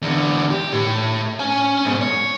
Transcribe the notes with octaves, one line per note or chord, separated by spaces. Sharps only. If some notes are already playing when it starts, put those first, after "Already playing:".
E2 D3
G4
A2
C#4 G#5
G#2 B2
C#5